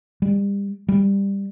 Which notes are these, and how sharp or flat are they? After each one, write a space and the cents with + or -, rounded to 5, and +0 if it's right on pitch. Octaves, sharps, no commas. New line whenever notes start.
G3 +30
G3 +15